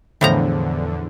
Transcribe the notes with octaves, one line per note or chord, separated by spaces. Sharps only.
E2 A2 D3 F3 A#5